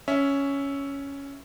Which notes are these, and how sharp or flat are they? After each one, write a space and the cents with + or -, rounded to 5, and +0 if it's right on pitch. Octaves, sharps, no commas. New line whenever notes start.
C#4 +5 E5 +0